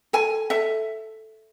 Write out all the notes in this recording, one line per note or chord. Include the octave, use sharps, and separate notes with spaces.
A4 G#5
A4 E5